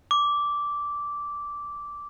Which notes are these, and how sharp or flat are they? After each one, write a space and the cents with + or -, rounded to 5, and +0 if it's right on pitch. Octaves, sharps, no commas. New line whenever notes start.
D6 -10